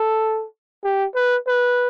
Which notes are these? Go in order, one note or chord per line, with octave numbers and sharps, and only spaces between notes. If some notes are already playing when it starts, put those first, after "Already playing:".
Already playing: A4
G4
B4
B4